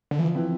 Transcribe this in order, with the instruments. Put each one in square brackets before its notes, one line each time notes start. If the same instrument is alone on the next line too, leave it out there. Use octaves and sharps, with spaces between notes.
[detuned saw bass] D3
[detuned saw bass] E3 [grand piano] F3
[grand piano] C4 E4 B4